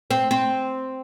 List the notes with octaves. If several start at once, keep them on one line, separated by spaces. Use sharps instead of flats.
C4
C4